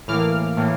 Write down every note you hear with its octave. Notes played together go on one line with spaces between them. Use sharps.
A2 E3 A#3 D6 F6
A2 E3 A#3